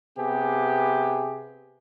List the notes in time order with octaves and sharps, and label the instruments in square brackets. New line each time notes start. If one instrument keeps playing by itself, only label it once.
[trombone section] C3 B3 G4 G#4